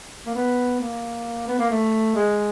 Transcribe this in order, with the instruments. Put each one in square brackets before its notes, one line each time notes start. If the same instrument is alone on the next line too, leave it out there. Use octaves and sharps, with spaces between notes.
[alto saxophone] A#3
B3
A#3
B3
A#3
A3
G#3